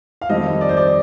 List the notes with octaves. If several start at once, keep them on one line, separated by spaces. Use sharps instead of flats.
F5
F2 D#3 G3 C4 D#5
D5
C5
D5